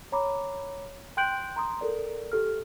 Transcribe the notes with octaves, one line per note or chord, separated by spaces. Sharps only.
C#5 A#5 B5 D6
G5 C6 F#6 G6 D7 F#7
A#5 C6 D#6
A4 A#4 D5
G4 A4 F6